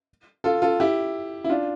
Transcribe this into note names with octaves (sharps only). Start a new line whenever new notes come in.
F4 A4
F4 A4
E4 G4
E4
D4 F4